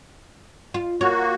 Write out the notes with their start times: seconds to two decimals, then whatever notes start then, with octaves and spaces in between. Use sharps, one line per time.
0.74 F4
1.01 A#3 F#4 C#5